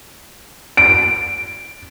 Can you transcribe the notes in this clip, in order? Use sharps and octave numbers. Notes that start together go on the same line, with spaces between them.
D7